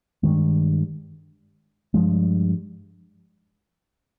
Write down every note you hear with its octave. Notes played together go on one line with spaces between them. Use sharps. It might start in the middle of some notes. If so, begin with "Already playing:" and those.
G2 D#3 G#3
G2 F3 G#3